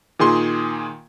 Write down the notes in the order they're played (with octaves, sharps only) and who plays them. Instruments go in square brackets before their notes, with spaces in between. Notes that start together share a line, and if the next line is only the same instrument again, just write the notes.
[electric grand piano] A#2 D#3 G#4 C6